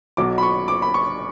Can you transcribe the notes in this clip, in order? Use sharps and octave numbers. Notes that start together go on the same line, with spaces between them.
B1 B2 F#3 D6
B5
C#6
D6
B5
C#6